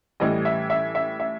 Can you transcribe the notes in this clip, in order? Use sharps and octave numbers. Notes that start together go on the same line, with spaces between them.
A2 E3 G3 D#5
E5
E5
E5
E5